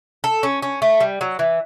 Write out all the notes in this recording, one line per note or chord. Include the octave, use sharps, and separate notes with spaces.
A4
C#4
C#4
A3
G3
F#3
E3